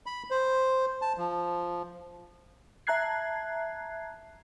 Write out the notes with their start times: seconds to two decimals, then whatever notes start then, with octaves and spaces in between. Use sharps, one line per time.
0.06 B5
0.31 C5
1.02 A5
1.17 F3
2.87 E5 A5 A#5 F#6 G#6 C7